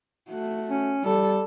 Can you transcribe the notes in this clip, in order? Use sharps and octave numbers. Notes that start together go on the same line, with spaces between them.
A3 F#4
C#4
G3 A4